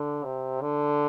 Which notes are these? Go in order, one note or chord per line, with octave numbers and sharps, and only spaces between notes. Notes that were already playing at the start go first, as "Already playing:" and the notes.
Already playing: D3
C3
D3